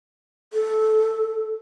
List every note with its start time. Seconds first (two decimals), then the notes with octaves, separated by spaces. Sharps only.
0.53 A4